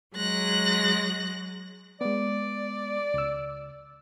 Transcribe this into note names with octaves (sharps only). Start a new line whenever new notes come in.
F#3 G#3 F#6 A#6
G#3 B3 D5
C#2 E6